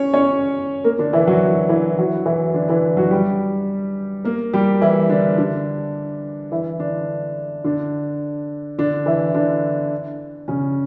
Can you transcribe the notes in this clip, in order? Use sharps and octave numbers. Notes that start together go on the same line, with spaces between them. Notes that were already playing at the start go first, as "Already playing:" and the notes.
Already playing: C#4 C#5
C#4 C#5
A#3 A#4
D3 D4
E3 E4
F#3 F#4
E3 E4
F#3 F#4
E3 E4
D3 D4
E3 E4
F#3 F#4
G3 G4
A#3 A#4
G3 G4
E3 E4
D3 D4
D3 D4
E3 E4
D3 D4
D3 D4
D3 D4
E3 E4
D3 D4
C#3 C#4